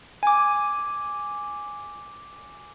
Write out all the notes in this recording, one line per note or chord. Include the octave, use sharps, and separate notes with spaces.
G#5 D6